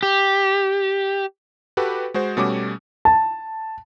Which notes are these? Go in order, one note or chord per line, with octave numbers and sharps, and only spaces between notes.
G4
F#4 G4 A4 B4
G#3 F#4 C5
B2 G3 A3 C#4 F#4 D6
A5